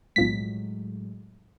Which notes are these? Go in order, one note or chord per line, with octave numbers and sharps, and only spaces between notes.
B1 A2 F3 F#3 G#3 B6